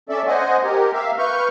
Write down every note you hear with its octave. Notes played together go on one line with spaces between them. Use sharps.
C#4 A4 D5 E5
C5 D#5 F#5 G#5
G4 A#4
E5 F5
B4 C#6 F6 G6